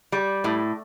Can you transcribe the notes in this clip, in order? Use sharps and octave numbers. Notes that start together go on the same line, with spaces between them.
G3
A2